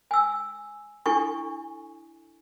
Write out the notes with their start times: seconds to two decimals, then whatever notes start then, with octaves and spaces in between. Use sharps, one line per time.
0.11 G#5 E6
1.06 D4 E4 G4 A4 G#5 C#6